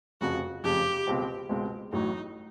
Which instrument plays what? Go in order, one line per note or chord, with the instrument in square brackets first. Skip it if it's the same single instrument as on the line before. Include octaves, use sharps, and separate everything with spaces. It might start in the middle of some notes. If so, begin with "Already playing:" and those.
[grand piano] F1 F2 C#3 [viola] F#4
[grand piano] F1 F2 C#3 [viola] G4
[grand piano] C#2 B2 G#3 C4
C#2 B2 G#3 C4
[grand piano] A1 A2 F#3 [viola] D#4